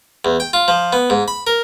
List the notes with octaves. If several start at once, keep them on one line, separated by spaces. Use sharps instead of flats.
E2
G5
F4
F3
B3
G#2
B5
A#4